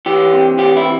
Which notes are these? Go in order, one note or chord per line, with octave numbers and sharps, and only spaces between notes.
E3 G4
C3
E3 G4
E4
C3